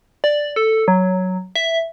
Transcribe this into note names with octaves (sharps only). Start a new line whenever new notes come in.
D5
A4
F#3
E5